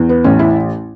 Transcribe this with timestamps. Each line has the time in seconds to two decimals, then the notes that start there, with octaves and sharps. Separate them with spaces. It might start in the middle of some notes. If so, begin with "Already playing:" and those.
Already playing: E2
0.09 B3
0.24 A1 C#4
0.39 E4